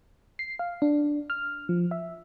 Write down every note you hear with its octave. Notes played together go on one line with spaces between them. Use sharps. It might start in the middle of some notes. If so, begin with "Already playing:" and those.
C7
F5
D4
F6
F3
E5